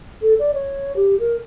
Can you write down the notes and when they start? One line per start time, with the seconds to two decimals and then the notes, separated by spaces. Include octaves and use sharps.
0.22 A4
0.39 D5
0.54 C#5
0.96 G4
1.20 A#4